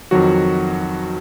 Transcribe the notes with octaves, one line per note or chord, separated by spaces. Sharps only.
F2 D#3 F#3 F#4